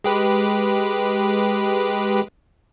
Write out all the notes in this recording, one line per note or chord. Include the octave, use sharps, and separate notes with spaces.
G#3 G4 B4